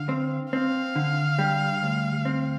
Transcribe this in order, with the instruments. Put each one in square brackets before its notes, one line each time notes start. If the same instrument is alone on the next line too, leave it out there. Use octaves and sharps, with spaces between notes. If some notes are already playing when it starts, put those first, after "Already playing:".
Already playing: [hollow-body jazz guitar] D3 [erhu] F5
[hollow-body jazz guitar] C4
[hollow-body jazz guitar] C4 [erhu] F5
[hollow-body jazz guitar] D3
G3
D2
C4